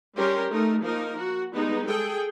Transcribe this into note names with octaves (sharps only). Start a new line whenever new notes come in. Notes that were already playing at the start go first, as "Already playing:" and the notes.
G3 C#4 G4 A#4 C6
A3 D#4 A#4
F3 A#3 D#4 A#4
F#4
G3 G#3 B3 D#4
G#4 A4 G5